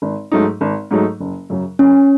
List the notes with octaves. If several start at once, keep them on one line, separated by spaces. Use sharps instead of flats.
G#1
G#2 F#3 A3 D#4
G#1
G#2 F#3 A3 D#4
F#1
F#2 C#3 F#3
F#1 C#4